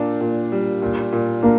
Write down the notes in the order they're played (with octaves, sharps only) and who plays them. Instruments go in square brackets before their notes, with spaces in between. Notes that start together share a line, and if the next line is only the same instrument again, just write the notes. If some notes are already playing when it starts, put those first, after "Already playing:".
Already playing: [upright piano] A#2 D4 [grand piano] A#3
[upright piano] A#2
G3
A#2
A#2
[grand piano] A#3 [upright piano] D4